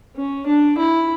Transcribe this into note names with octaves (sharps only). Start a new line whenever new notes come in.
C#4
D4
E4